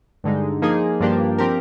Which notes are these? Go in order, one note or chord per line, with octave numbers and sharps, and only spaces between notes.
G2 D3 G#3 D#4
F3 A#3 D#4 G#4
G2 F3 A#3 D4 G4
F3 C4 G4 A#4